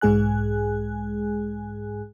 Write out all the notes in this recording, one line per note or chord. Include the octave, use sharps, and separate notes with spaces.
B1 G#2 G#3 G#4 G#5 F#6